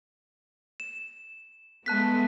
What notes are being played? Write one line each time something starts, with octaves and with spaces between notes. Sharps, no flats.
E7
G#3 A3 B3 A5 F#6 B6